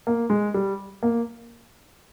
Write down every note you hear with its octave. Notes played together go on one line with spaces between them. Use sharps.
A#3
G#3
G3
A#3